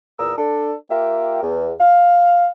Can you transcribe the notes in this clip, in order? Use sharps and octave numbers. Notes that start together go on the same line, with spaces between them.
E2 A#2 A#4 D#6 E6
D4 A4
A#3 F4 G4 A#4 E5 G5
E2
F5